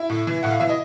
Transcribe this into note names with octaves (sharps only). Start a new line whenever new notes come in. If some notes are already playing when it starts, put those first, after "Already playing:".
Already playing: E4 E5
A2
E3
A2 F#5
F5
E3 E5
D#5